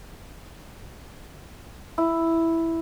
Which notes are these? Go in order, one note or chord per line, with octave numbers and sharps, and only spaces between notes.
E4